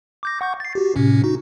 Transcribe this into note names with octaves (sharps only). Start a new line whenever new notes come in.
D6 G6 A#6
F#5 C#6 G6
A6 C7
F#4 G4
A2 C3 C#4
D#4 F#4